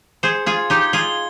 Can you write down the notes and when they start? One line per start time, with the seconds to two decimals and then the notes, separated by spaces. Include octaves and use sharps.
0.23 G#4 C5 C#7
0.46 F4 G#4 G#6
0.70 D#4 G4 G7
0.93 F4 G#4 G7